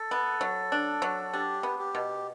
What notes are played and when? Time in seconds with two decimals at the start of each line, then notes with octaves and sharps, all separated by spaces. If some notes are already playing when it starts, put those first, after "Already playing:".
Already playing: A4
0.11 B3
0.41 F#3
0.72 D4
1.02 F#3
1.33 D4 G4
1.63 B3
1.79 G4
1.95 B2